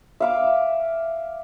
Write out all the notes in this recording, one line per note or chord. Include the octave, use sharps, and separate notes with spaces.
E5 F5 D6